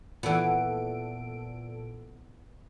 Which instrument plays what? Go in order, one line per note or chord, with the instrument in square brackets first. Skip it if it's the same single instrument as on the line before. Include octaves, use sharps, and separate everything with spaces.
[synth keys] A#2 A4 D7 [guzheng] E3 B3